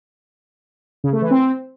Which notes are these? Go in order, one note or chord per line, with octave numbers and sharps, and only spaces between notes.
C#3
A3
E3
C4